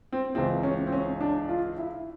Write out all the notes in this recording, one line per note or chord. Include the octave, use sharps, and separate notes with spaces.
C4
C#2 C#3 E3 C4
C#4
C4
C#4
D4
F4
E4